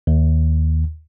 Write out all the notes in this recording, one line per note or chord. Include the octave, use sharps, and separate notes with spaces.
D#2